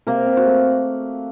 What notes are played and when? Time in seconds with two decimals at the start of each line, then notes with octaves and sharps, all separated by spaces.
0.07 C3 A#3 A#4
0.26 C3
0.37 F#4 F#5
0.46 A3